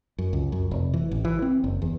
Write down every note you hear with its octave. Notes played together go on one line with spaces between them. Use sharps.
F#2
C#2
F#2
F1
E3
A1
E3
C4
F#1
E2